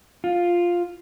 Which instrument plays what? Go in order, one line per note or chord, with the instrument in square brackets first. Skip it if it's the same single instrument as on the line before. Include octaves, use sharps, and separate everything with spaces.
[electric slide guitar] F4